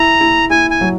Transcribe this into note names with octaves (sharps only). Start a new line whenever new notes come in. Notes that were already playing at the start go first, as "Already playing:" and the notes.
Already playing: E4 A#5
E4
E4 G#5
G#5
F#3